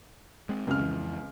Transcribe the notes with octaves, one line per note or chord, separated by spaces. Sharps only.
G#3 C4
F1 C#2 F#2 C4 F6
F2 E3